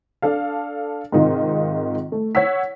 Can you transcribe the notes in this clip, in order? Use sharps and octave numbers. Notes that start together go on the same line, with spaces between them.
D4 A4 F5
G#2 C3 D#3 D#4 F4
A3
C#5 F#5 E6 B6